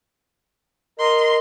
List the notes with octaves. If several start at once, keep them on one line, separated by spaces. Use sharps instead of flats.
A#4 D#5 C6